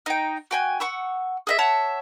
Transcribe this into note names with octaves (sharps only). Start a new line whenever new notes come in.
D#4 G5
F#4 G5 G#5
F#5 C#6 E6
G#4 D#5 E5
C#5 E5 F#5 A5